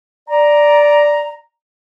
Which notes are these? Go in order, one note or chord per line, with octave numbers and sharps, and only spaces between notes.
D5 A#5